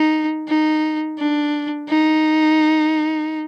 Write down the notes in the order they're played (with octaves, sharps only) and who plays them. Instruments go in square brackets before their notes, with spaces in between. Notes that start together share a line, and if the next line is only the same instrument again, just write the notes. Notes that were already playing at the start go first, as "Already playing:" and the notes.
Already playing: [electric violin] D#4
D#4
D4
D#4